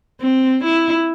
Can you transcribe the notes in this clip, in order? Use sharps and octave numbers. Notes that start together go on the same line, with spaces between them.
C4
E4